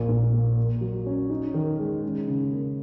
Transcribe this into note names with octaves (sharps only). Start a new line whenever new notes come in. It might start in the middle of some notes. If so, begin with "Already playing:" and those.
Already playing: A#1 A#3
A#2
A#3
A#4
F#3
C#4
D#4
D#3
G#3
C#4
C#3
A#3